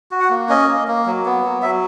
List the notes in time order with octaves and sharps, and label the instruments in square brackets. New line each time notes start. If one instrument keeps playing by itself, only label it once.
[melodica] F#4
F#5
A#3
C#4 D#5
A#3
A#3
F#3
B3
F#3
F#3 E5